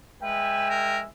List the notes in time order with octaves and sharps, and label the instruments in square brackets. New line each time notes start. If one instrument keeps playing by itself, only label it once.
[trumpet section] G#3 E5 G#5 [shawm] B4 [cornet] G5
[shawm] A#4